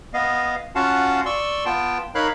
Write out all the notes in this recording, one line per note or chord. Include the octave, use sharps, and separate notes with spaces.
B3 D#5 F5
C#4 F4 F#4 F5 F#5 A5
D5 C6 C#6 E6
B3 F4 G5 A5
D#4 A#4 C#5 F5 B5 F#6